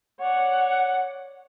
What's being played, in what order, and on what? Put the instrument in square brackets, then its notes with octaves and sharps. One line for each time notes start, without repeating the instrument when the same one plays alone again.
[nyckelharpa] C#5 D5 [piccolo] F#5